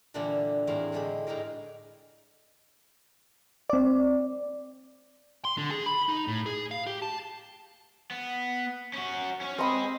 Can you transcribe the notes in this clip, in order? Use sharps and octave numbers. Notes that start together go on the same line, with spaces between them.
A#2 D3 E3 G3 D4 E4
E2 A2 C4 E4 A#4 F5
A2 D3 G#3 G4 B5
G#2 D#4 E4 G4 A#4
C4 D5
C6
D3
G#4
B5
D#4
A2
G#4
F5
G4
A5
B3
C#4 F#4
C#4 C#5
C4 G#4 D#5 B5